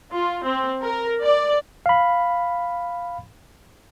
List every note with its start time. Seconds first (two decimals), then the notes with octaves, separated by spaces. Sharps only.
0.13 F4
0.44 C4
0.82 A#4
1.21 D5
1.86 F5 B5